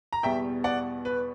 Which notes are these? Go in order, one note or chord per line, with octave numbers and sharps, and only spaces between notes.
A#5
E2 B2 G3 E5 G5
D5 F#5
B4